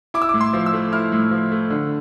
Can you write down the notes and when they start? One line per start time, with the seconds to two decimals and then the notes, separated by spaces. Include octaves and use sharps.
0.14 E4 D6
0.22 E6
0.29 A2 D6
0.41 C6
0.53 F3
0.66 E6
0.73 A3
0.92 E4 F6
1.12 A2
1.31 F3
1.51 A3
1.70 D3